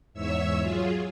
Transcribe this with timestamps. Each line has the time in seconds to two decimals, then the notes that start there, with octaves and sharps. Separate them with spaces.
0.14 E2 G#2 C#5 E5 E6
0.58 F#3 F4 G#4